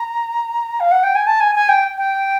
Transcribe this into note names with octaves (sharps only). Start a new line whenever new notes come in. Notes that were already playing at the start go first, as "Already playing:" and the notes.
Already playing: A#5
F5
F#5
G5
G#5
A5
G#5
G#5
G5
G5